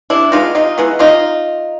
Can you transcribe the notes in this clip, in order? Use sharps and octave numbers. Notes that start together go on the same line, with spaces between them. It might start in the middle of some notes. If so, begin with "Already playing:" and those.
C3 D4 E4
E3 G#3 B3 D#4 F4
C3 D#4 F4
E3 G#3 B3
C3 D#4 F4